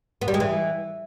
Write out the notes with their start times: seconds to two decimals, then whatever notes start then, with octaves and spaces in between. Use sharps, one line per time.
0.21 B3
0.28 G3
0.34 G#3
0.40 E3